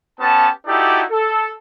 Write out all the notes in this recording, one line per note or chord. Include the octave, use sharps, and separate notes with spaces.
B3 C#4 G4 A5
D#4 E4 F#4 G4 A4 D5
A4